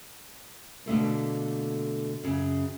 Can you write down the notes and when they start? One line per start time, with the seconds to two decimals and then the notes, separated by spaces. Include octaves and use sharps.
0.86 B2 D3 A3 A#3
2.24 F#2 C#3